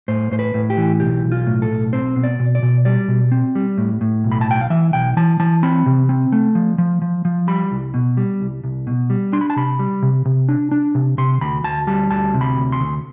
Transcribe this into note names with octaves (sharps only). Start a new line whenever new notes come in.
A2 C5
A2 C5
B4
A2
G4
E3
B1 G4
B1
F4
A2
A4
B1
C4 C5
B2
D5
B2
D5
B2
G3 D5
B2
C4
G3
A2
A2
B1
B5
A5
B1 G5
F5
E3 E5
B1 G5
E3 A5
E3 A5
C4 B5
C3
C4
A3
F3
F3
F3
F3
G3 B5
C2
B2
G3
C2
C2
B2
G3
D4 C6
B5
A5
C3 B5
G3
C3
C3
D4
D4
C3
C3 C6
D2 B5
D2 A5
G3 A5
D2 A5
C3
B5
D2
C6
D2